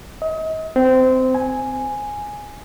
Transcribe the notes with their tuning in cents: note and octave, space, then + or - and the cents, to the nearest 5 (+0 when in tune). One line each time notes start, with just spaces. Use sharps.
D#5 +35
C4 -20
G#5 +0